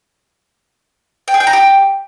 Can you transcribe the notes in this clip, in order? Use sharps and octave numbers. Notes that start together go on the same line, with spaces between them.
G5
G#4
G5
A#5
G4